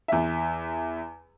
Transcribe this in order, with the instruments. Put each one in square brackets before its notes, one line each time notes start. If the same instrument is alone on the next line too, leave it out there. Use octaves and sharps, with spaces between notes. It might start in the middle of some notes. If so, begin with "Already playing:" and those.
[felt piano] E2 E5